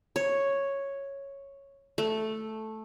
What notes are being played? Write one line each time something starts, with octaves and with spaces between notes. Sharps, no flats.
C#5
A3